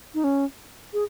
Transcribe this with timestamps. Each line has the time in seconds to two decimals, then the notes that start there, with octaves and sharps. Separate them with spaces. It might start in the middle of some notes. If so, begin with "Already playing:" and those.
0.14 D#4
0.24 C#4
0.93 G#4